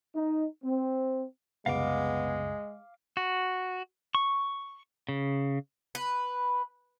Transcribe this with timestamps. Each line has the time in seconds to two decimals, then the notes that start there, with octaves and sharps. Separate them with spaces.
0.15 D#4
0.64 C4
1.66 C2 F#2 C#3 G#3 B3 F5 D6
3.17 F#4
4.15 C#6
5.09 C#3
5.95 B4